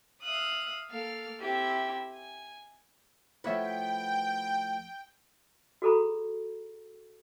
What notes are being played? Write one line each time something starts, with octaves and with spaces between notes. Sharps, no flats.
E5 F5 D#6 F#6
A#3 A4 F5 F6
C4 E4 G4 E5
G#5
F3 A3 B3 E4 B4 C#5 E5 G5
F#4 G#4 A4 A#5 B5